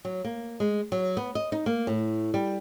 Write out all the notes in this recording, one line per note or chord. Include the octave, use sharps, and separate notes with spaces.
F#3
A#3
G#3
F#3
B3
D#5
D#4
A#3
A2
G3